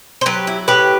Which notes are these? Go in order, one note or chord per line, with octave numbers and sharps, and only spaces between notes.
C5
F#3 G4 B4
E4
A2 G4 B4